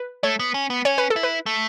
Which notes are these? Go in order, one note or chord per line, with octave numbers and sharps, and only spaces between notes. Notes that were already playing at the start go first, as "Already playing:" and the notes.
Already playing: B4
A3 C#5
B3
C#4
B3
C#4 C#5
B4
A4
E4
B4
A3